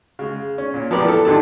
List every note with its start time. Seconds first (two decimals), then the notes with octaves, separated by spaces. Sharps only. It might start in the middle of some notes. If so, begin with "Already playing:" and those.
0.19 C#3 G#3
0.58 C#4
0.74 A#2
0.91 F3 G#3 B3 G4 A#4 D5
1.04 E3 A4
1.25 G#1 G#2 D3 G4 A5